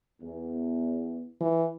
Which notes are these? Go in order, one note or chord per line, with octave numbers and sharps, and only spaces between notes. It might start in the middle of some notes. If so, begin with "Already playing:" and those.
E2
E3